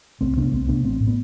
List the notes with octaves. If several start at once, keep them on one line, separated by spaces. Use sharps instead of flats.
C2 A3 C4
C3 B3 D4
C2 A3 C4
C3 B3 D4
A1 A3 C4
A2
B3